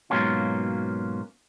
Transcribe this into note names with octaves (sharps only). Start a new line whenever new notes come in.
G#2 B2 F#3 A#3 C#4 F4